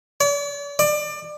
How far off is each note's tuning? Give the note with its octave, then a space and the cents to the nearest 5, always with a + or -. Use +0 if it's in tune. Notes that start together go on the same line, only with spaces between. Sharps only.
D5 -45
D5 +25